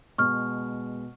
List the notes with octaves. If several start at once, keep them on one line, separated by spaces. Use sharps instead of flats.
B2 G#3 B3 C#6 F6